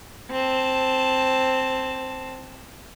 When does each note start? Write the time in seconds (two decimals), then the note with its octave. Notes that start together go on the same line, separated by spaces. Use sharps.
0.31 C4 A5